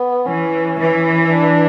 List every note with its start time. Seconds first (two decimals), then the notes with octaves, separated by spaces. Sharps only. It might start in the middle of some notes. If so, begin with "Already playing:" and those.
Already playing: B3
0.26 E3 C#4
0.78 E3
1.30 D4